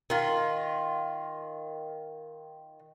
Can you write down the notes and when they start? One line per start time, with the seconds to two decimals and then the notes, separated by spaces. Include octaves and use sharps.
0.10 D#3 F4